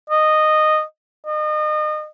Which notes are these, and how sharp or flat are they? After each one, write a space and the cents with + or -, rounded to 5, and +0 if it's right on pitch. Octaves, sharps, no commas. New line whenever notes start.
D#5 -10
D#5 -35